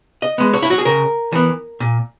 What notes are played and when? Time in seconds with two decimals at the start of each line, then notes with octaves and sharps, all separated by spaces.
0.22 D#5
0.38 G#3 B3
0.54 C#5
0.62 E4
0.70 F#4
0.78 G#4
0.85 C#3 A#4
1.32 E3 B3
1.80 A#2